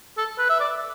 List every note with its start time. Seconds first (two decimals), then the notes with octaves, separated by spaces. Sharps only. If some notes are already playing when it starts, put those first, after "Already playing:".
0.17 A4
0.38 B4
0.49 E5
0.60 D5